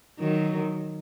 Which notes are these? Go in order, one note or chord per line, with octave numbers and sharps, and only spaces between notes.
D#3 F#3